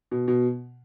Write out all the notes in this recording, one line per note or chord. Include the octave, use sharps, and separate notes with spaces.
B2
B2